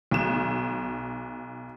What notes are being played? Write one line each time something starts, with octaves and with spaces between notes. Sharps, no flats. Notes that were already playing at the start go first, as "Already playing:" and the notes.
B1 E7